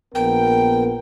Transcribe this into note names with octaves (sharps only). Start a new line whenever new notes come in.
A#1 B3 A#4 G5